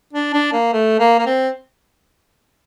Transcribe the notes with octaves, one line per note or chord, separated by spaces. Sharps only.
D4
D4
A#3
A3
A#3
A#3
C4